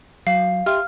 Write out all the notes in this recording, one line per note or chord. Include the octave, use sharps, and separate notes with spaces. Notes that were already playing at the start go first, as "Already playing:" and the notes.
F#3 F5
G4 E5 C6 F6